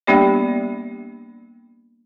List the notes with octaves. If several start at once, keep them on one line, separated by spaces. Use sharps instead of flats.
G3 A#3 B3 D4 G4 D5